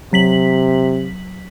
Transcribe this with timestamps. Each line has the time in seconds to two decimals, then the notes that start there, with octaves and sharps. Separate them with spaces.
0.13 C3 F#3 B6 F#7